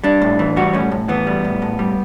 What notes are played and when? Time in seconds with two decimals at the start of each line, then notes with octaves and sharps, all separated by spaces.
0.04 G3 D4
0.22 A2
0.39 E3
0.56 G3 F#4
0.73 A2 C#4
0.92 A2
1.09 E3 B3
1.27 G3
1.44 A2
1.62 A2
1.79 G3